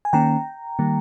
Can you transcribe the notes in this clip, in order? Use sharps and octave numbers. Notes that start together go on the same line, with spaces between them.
G#5
D#3 A#3 C#4 G5 A#5
D#3 G3 A#3